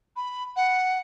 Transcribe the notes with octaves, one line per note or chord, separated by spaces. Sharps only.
B5
F#5